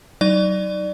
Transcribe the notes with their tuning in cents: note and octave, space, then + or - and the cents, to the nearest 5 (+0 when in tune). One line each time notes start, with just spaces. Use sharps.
F#3 +30 D#4 +0 D5 +15